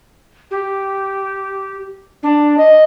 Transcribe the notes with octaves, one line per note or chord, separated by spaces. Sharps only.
G4
D4
D#5